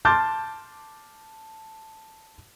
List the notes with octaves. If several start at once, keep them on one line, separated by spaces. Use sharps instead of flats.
A5 C6 D6 F6 G6 A6